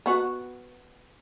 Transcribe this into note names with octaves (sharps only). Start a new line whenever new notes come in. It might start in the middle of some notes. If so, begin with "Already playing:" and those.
B3 F#4